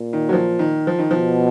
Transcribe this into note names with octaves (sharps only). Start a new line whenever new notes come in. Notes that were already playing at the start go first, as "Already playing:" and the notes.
Already playing: A#2
D#3
F#3
F3
D#3
F3
D#3
B2 F3